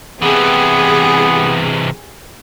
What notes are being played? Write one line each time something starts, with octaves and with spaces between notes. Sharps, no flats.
C3 E3 B3 G4 G#4